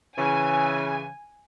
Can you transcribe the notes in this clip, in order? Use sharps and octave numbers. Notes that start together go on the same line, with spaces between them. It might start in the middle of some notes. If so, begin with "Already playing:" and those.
C#3 E3 G#5